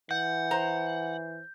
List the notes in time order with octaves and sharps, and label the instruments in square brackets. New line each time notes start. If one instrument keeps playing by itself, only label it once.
[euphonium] E3 [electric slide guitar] F#5 [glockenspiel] G6
[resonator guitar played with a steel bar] C5 A#5